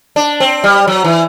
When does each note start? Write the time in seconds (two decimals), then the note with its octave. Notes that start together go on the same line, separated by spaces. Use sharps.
0.16 D4
0.40 C4
0.64 G3
0.88 F#3
1.04 E3